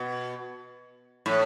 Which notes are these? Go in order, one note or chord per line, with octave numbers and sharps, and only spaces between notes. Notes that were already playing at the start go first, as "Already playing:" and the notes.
Already playing: B2
A2